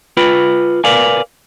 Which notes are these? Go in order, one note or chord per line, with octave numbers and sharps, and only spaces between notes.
F4 B4 G5 B5
A#4 B4 D5 F5 G#5